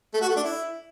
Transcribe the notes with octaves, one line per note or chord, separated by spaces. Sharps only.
A3
F#4
A3
D4
E4